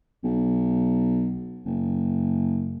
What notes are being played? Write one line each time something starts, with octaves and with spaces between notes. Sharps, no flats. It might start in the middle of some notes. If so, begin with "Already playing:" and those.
B1
F#1